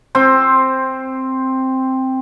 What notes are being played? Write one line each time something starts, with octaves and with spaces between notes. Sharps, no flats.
C4 C5